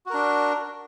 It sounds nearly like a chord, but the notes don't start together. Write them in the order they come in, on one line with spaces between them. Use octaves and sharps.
F#4 A#4 D4